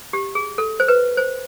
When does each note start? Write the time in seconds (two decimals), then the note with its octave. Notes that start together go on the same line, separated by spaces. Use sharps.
0.13 G4
0.35 G#4
0.58 A4
0.80 C5
0.88 B4
1.17 C5